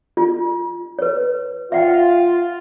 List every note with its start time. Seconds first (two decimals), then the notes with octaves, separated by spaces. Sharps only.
0.17 F4
0.99 B4 C#5
1.72 F4 E5 F#5 G5